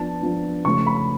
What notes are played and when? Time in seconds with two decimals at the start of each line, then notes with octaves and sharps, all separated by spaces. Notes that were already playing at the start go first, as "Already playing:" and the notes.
Already playing: F3 B3 D4 A5
0.22 F3 B3 D4
0.65 C#3 F3 A3 C#4 C#6
0.87 B5